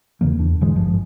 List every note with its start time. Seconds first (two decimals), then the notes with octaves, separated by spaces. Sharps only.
0.21 E2 C#3 E3 A#3
0.39 E2 D4
0.61 G#2 D3 E3 G#3
0.75 G#1 G2 F3